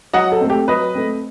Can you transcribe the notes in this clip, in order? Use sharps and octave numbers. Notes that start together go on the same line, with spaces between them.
F#3 D#5 F#5
A4
A3 C4
G4
F#3 B4 D#5
A3 C4